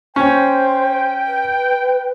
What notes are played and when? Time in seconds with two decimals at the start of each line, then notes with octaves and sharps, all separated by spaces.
0.16 C#4 C5 G5
1.27 B4